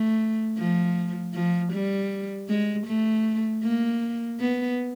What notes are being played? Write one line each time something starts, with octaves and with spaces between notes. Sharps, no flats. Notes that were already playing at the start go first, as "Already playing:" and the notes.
Already playing: A3
F3
F3
G3
G#3
A3
A#3
B3